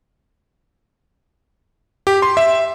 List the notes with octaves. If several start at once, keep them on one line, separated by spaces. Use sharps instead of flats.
G4
C6
E5